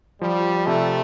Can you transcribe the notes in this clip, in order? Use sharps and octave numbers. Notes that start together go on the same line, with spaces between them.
F3 G3
C3 A3